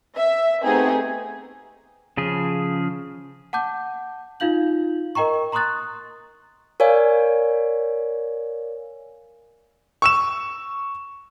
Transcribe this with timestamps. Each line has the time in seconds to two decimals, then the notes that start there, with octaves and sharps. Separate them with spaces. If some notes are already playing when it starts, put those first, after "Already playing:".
0.16 E5
0.63 A3 B3 C4 D#4 G4 G#4
2.17 C#3 F3 G#4
3.53 F#5 A5 D6 G6
4.40 D#4 F4 F5 G6 F#7
5.15 A#4 D#5 G5 A#5 C#6
5.52 A#5 C6 C#6 D#6 F#6 A6
6.80 A#4 C#5 D5 F5 G#5
10.02 C#6 E6 E7